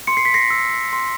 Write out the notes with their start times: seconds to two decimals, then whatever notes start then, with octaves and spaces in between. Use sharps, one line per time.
0.07 C6 C#7
0.17 C7
0.25 B6
0.34 A#6 C7
0.50 E6
0.93 C6